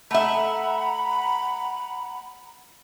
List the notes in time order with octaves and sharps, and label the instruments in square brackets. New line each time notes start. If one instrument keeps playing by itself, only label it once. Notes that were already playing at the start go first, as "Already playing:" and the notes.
[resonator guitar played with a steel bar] A3 E5 [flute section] F#5 A#5 B5